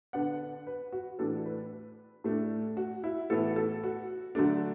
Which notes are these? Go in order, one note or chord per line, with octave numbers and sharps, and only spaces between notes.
D3 B3 D4 F#5
B4
F#4
A2 E3 D4 A4
B4
A2 A3 D4
F#4
E4
A2 E3 B3 E4 A4
A4
F#4
D3 F#3 A3 D4